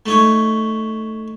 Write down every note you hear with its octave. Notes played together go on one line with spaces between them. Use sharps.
A3 D#4 C#5